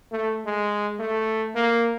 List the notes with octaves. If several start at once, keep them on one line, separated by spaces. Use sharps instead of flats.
A3
G#3
A3
A#3